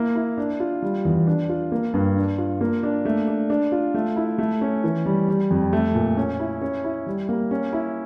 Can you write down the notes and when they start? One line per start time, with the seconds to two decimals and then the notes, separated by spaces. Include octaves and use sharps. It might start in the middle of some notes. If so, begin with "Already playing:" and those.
Already playing: A#3 E4
0.15 E4
0.38 D4
0.60 F4
0.82 G3
1.05 E2
1.27 D4
1.49 F4
1.72 A#3
1.94 G2
2.16 D4
2.38 F4
2.61 A#3
2.83 D4
3.05 A3
3.28 D4
3.50 D4
3.72 F4
3.94 A3
4.16 E4
4.38 A3
4.61 C#4
4.84 E3
5.06 G3
5.28 G3
5.51 F2
5.73 A3
5.95 A#2
6.17 C#4
6.40 E4
6.62 C#4
6.84 E4
7.07 G3
7.29 A#3
7.51 C#4
7.73 E4